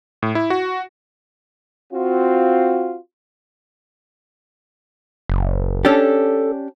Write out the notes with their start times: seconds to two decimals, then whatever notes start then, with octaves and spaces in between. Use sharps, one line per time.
0.22 A2
0.35 E4
0.50 F#4
1.93 C4 F4 F#4
5.29 F#1
5.85 C#4 D4 G4 A4